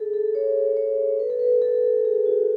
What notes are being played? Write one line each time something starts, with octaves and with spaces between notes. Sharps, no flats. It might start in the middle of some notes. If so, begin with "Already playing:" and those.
Already playing: G#4 A4
A4
C#5
C#5
B4
A4
B4
A4
G#4
F#4